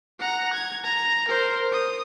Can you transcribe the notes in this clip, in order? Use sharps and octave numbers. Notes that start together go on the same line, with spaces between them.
F#5 A#5
G#6
A#5
A#4 C5
D#6